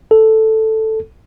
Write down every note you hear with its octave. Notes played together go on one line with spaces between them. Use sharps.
A4